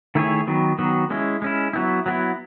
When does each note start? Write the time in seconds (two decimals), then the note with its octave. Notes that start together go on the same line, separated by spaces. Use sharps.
0.15 D#3 A3 E4 G#4 C#5
0.47 D#3 F#3 B3
0.79 D#3 F#3 B3
1.10 G#3 C#4 E4
1.42 G#3 C#4 E4
1.73 F#3 B3 E4
2.06 F#3 B3 E4